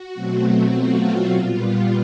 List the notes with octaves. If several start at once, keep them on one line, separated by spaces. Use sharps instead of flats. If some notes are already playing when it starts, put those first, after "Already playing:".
Already playing: F#4
B2 F#3 A3 C4
F4
A#2 G3 B3